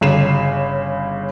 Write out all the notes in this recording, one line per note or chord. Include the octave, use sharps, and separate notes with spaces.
G1 C#3 C7 E7